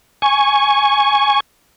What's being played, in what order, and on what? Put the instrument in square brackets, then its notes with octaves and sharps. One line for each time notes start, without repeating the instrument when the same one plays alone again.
[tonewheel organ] G#5 C#6